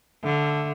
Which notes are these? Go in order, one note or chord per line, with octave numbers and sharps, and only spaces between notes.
D3 A3